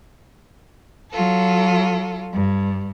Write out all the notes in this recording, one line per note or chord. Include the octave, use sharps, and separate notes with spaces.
F#3 F4 A4
G2